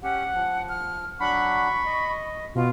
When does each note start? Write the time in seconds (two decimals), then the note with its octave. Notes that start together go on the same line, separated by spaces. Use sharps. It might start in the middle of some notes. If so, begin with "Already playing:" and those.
0.03 C#4 G4 F#5
0.34 F3
0.69 F6
1.20 F#3 D4 F#5 B5 C#6
1.85 D#5
2.55 B2 F4